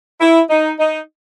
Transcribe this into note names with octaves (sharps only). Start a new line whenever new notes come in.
E4
D#4
D#4